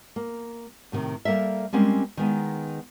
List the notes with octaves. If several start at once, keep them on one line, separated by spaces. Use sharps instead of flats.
A#3
A2 C3 D#3
G3 A#3 A4 A#4 E5
G3 G#3 A#3 C4 C#4
D#3 G#3 B3 D#4